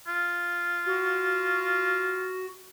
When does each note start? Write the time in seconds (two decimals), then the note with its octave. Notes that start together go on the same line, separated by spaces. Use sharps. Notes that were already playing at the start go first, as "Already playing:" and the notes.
0.07 F4
0.86 F#4